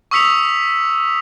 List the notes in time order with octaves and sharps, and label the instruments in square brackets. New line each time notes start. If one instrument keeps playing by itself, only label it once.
[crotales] C#6 D#6 E6 B6 C#7 F7